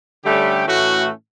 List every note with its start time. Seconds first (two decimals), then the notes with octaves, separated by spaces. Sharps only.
0.24 D3 G3 A3 C#4 G4
0.67 A2 E3 A3 C#4 F#4